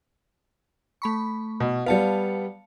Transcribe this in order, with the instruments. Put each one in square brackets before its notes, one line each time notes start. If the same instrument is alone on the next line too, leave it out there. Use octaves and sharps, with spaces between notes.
[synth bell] A3 B5 C#6
[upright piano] B2
[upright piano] G3 B3 [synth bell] F5 A5 C#7